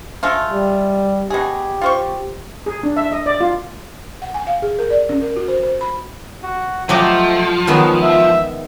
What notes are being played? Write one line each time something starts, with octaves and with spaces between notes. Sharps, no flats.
G#3 A3 F4
G3
B2 G4 G#4
F4 C5 C#6
G#4
D4
E5
D#5
D5
F4
F#5
G#5
F5
G#4
A#4
D5
C#4
A#4
F#4
C5
C5
B5
F#4
F3 F#3 A3 G4 D#5
D#3 F#3 G#3 B3
E5